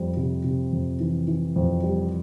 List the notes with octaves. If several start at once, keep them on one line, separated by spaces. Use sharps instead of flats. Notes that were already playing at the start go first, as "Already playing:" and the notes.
Already playing: F2 G3
C3
C3
F2
E3
E3
F2
G3